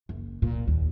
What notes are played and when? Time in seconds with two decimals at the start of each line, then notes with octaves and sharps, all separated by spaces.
0.09 F#1
0.42 A#2
0.68 D#2